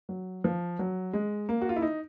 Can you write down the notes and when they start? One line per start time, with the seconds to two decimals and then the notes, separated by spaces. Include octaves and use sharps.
0.09 F#3
0.44 F3
0.79 F#3
1.13 G#3
1.49 A#3
1.61 F#4
1.69 F4
1.76 E4
1.82 D#4